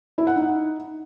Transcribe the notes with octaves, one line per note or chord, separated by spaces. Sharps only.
E4
F#5
D#4